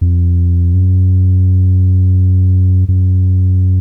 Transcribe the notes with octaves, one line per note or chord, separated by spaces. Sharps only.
F2
F#2
F#2